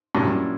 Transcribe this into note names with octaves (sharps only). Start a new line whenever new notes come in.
G2 A#2 F#3 A#3 C#4 E4